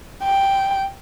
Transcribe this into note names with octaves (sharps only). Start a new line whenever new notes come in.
G5